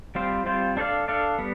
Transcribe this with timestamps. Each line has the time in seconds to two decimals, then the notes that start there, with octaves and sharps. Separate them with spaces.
0.15 G3 C4 F4 C5
0.46 G3 C4 F4 C5
0.77 D4 A4 D5 F5
1.08 D4 A4 D5 F5
1.38 G3 B3